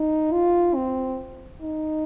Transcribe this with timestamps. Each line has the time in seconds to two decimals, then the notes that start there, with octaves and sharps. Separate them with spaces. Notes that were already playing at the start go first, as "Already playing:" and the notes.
Already playing: D#4
0.33 F4
0.75 C4
1.61 D#4